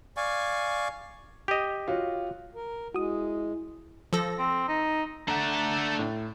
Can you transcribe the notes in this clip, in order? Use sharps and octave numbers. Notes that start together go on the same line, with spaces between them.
D5 F5 G#5 C#6
G4 D#5
F4 F#4 C#5
A#4
G#3 E4 F#4 D#6
F3 A4 A#6
C4
D#4
A3 D4 A4 F#5 A#5
A2